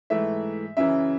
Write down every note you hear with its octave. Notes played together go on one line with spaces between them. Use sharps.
G#2 E3 A3 E5
F#2 C#3 E3 E5